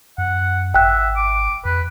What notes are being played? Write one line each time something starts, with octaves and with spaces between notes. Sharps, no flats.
F#2 F#5
G#1 E5 G5 F#6
D6
F2 B4